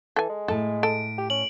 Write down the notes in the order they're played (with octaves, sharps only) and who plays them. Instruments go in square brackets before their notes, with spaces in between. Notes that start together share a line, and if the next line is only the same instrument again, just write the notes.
[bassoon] E3 [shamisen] A4 G#5
[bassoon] G#3
[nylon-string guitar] A2 A5 [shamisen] A4
[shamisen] A4 [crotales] D7
[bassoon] G4
[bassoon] C#4 [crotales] F#7